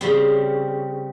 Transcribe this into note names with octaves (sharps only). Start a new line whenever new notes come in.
C#3 G3 C4